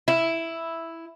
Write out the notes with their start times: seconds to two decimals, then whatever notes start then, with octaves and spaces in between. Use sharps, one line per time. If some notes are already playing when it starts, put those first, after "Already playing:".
0.08 E4